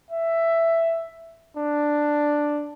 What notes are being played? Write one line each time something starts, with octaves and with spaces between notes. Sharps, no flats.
E5
D4